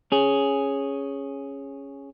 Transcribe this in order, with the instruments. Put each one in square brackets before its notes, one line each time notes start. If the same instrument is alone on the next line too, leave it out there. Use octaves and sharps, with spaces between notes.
[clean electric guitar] C#4 G#4